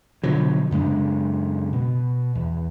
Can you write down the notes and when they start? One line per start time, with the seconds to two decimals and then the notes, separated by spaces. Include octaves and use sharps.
0.24 B2 D3 F3 F#3
0.71 F#2 C#3 G#3 D4
1.73 B2
2.35 E2